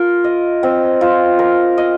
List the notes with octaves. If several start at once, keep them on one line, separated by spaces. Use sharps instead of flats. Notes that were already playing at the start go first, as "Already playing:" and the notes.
Already playing: F4 A#4
D#5
C4
F4
A#4
D#5